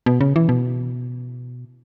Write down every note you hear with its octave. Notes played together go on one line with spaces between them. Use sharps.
B2
C#3
E3
B2